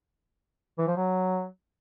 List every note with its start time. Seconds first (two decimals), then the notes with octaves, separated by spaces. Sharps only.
0.78 E3
0.87 F3
0.96 F#3